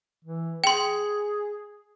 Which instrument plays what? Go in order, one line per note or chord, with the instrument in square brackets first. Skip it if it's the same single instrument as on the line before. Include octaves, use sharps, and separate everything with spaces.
[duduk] E3
[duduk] G#4 [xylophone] G5 C6